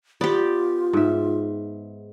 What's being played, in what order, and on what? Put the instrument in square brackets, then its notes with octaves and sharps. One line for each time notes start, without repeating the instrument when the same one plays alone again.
[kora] B3 [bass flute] F4 [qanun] G4 D5
[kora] G#2 E5